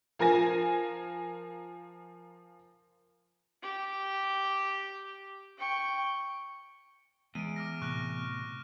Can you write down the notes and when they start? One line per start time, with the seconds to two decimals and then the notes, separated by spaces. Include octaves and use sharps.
0.19 F3 A#4 G#5 A#6
3.62 G4
5.58 G5 C#6
7.35 E2 G#3 D7 D#7
7.56 D6 F6 A#6
7.81 A2 C3 C#6 F6 F#6